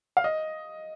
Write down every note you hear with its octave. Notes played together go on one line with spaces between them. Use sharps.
F5
D#5